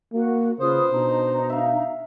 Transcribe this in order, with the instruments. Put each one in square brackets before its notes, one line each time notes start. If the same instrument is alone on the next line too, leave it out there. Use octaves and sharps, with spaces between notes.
[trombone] A#3 [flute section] F#4
[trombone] C#3 [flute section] F4 B4 D#6 [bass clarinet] C5
[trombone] B2 [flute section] D4 D#4 A#5
[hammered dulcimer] E5 F5